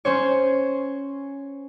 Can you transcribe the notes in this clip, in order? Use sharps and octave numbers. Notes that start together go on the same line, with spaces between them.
C#4 C5 C#5